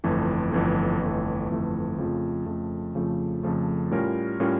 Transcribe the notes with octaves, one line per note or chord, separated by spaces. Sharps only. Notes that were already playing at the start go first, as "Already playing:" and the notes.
G1 F2 E3 A3
G1 F2 E3 A3
G1 F2 E3 A3
G1 F2 E3 A3
F2 C#3 F3 A3
F2 C#3 F3 A3
F2 C#3 F3 A3
F2 C#3 F3 A3
A2 G3 C#4 F4 A#4
A2 G3 C#4 F4 A#4